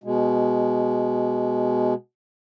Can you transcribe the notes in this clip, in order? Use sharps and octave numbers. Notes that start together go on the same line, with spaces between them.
B2 G#3